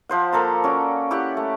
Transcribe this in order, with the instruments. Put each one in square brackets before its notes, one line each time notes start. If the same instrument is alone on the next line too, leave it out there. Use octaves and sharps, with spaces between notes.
[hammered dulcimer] F3 C5 F#5
A#3 A4 A#5 B5
C#4 F#4 D5
E4 G4 E5 F#5
A3